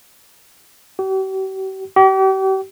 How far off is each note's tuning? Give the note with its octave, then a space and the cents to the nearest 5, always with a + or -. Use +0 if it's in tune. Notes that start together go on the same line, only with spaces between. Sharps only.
G4 -45
G4 -40